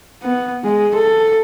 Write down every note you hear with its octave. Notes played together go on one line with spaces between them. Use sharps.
B3
G#3
A4